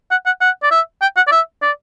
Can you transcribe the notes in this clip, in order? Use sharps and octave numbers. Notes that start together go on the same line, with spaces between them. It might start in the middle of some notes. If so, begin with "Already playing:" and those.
F#5
F#5
F#5
D5
E5
G5
F#5
D5
E5
D5